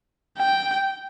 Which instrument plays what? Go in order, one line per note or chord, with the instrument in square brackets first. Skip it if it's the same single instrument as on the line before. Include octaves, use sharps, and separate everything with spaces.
[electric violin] G5